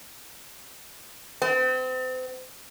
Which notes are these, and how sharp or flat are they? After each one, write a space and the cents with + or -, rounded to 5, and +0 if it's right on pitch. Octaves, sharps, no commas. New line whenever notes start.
C4 -35